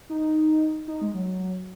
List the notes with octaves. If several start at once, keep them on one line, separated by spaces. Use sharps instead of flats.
D#4
D#4
G#3
F#3